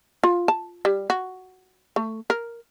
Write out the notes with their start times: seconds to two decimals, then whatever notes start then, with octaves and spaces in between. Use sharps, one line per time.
0.24 F4
0.48 A5
0.85 G3
1.10 F#4
1.96 A3
2.30 A#4